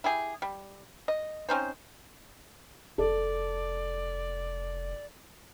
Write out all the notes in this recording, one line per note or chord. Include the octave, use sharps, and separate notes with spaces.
E4 G4 G#4
G3
D#5
C4 C#4 D#4 C5
F1 A4 D5